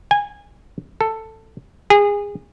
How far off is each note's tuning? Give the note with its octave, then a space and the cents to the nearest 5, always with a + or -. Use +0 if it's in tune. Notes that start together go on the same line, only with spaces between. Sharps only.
G#5 -20
A4 +10
G#4 -25